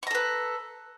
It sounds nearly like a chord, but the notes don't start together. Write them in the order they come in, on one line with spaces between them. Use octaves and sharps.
C#6 A#5 A4 B4